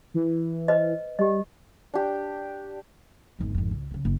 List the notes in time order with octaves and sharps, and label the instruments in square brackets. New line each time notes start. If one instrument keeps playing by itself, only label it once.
[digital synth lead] E3
[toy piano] B4 C5 D#5
[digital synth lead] G3 [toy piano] G4 D#5
[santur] D4 G4
[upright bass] G#1 E2
G#1 F2
C#2
A#2 C#3
F#1